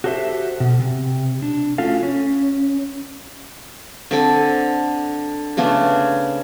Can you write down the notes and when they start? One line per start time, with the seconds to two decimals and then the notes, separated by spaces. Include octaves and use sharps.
0.04 F#4 G4 A4 C5 D#5 E5
0.60 B2
0.80 C3
1.42 D4
1.78 A3 C#4 F4 F#4 A4 F5
2.03 C#4
4.11 D3 C4 A4 G#5
5.57 C#3 A3 B3 D4